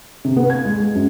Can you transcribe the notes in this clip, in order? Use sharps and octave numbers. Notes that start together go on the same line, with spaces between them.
C3
B3
G#6
G#3
G#3
F#2